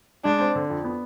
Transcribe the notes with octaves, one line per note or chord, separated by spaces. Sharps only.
G#3 D4
C4
D3
F2
B3